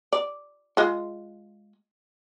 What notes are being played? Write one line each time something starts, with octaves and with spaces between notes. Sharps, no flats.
D5
G#3 F4